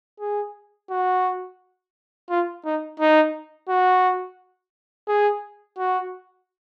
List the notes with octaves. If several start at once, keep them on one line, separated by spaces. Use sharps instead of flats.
G#4
F#4
F4
D#4
D#4
F#4
G#4
F#4